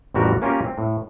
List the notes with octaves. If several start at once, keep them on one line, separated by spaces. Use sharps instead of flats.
A1 F2 G3 F#4 G4 A#4
A#3 C#4 F4 G4 A#4
C4
A2